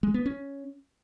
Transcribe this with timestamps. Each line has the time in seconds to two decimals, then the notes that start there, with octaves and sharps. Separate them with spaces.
0.03 G#3
0.14 B3
0.26 C#4